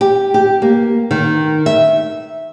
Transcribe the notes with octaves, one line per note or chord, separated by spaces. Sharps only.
G4
G4
A#3
D#3
E5